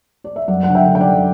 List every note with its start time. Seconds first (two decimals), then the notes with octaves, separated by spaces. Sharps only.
0.24 D5
0.36 E5
0.48 F#2 D5 F#5
0.63 D3 F#5
0.75 E5 G5
0.87 D3
0.95 G5
1.01 D5 F#5
1.08 F#2